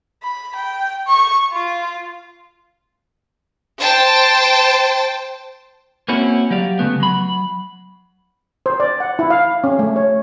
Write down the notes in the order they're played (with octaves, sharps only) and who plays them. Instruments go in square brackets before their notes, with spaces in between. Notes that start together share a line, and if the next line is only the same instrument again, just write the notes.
[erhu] B5
G5
C#6
F4
[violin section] C5 G5 A5
[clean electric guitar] A#3 C4 C#4 E4 F#4
F#3 G4 D5 F5
C#3 A3 B3
F#3 B5
[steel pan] C5
D5
F#5
E4
F5
C#4
A3
C#5